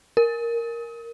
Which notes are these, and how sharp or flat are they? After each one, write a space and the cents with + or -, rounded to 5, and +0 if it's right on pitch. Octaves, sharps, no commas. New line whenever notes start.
A#4 +0